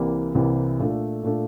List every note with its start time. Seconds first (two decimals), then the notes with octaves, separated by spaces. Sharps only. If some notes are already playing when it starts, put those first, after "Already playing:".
Already playing: C2 C3 E3 A#3
0.35 C2 C3 E3 A#3
0.79 A#2 A3 D4 A4
1.23 A#2 A3 D4 A4